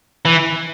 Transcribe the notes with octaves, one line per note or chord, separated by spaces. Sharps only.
E3